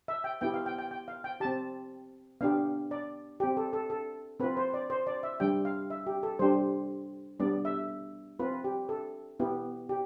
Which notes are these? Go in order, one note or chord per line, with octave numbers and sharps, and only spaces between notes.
E5
G5
B3 E4 G4 G5
F5
G5
G5
G5
F5
G5
C4 G4 A5
B3 D4 G4 F5
D5
C4 G4
A4
A4
A4
C4 F4 B4
C5
D5
C5
D5
E5
G3 D4 G4 G5
F5
E5
G4
A4
G3 D4 G4 C5
G3 B3 D4 D5
E5
C4 F4 B4
G4
A4
B3 E4 G4
G4